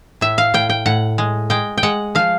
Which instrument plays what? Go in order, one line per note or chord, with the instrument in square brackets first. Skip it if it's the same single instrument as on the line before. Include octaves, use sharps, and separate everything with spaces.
[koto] A2 E5
F5
A2 G5
G5
A2 F#5
G#3
G#3 G5
G5
G#3 F#5
F3 F5